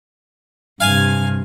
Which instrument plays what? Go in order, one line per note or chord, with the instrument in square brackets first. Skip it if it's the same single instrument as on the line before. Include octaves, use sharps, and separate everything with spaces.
[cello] G2 C3 [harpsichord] F5 G#5